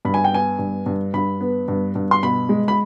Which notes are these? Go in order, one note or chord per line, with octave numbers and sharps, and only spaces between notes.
G2 B5
G#5
G5
B3 G#5
G2
G2
G2 B5
B3
G2
G2
C6
B2 B5
G#3
B5